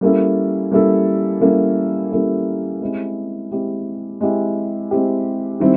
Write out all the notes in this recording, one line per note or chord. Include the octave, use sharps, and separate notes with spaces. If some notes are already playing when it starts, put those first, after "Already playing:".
G3 A#3 C#4 E4 A4
G3 A#3 C#4 E4 A4
G3 A#3 C#4 E4 A4
G3 A#3 C#4 E4 A4
G#3 C4 E4 G4
G#3 C4 E4 G4
G#3 C4 E4 G4
G#3 C4 E4 G4
D#3 G3 C4 E4